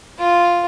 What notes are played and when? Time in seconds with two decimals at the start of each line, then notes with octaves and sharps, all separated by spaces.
0.19 F4